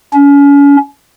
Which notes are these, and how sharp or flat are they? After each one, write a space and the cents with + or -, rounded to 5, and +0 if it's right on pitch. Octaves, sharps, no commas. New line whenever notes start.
C#4 +35